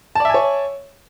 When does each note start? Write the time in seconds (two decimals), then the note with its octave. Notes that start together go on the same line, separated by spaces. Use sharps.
0.15 A5
0.20 D5
0.25 E5
0.30 G#5
0.34 C#5